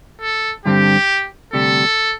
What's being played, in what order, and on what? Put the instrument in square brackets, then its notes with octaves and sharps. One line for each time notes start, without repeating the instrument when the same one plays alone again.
[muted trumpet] A4
[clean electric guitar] G2 D3 G3 C4 [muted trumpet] G4
[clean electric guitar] D2 C3 G3 [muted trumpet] A4